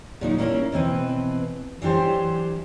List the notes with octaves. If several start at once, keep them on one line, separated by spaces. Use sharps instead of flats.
A#2 F#3 D#4
A#3 C#4 E4 A4 A#4
B2 E3 C4 B4
E3 F#3 D4 G4 C5